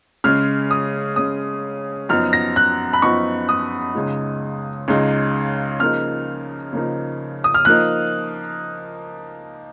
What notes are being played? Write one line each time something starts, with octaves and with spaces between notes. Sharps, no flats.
C#3 G#3 C#4 F6
D#6
C#3 G#3 C#4 D#6
F#2 F3 B3 D#4 F6
A#6
F#6
B5
F#2 F3 B3 D#4 C#6
D#6
C#2 C#3 G#3 D#4
C#2 C#3 G#3 D#4
C#3 F3 A#3 D#4 F6
C#3 F3 A#3 D#4
D#6
F6
F3 A#3 D#4 F#6